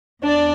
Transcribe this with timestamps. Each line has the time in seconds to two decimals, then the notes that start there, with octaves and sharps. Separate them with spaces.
0.23 E2 D4 D5